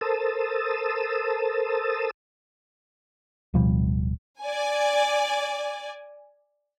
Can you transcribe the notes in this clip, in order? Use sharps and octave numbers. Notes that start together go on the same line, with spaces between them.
A4 A#4 C5 A5 D#6 E6
D1 B2 F3 G3
D5 G#5